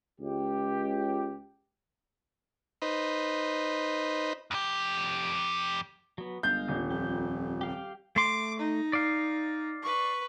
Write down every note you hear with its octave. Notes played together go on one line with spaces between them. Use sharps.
C#2 G4
D#4 B4 C5
F2 G4
F#3 B3
G1 G#3 F5 G6
D#1
F2 G4
G4 F5 G5
A3 C6 D6
D#4
D5 F5
B4 C#6